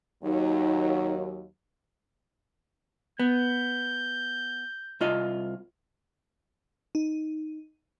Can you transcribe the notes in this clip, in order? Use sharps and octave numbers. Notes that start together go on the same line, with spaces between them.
D#2 F#3 D#4
B3 G6
C2 F4 D#5
D#4